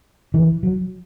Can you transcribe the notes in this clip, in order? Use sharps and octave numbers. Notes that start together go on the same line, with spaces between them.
E3
F#3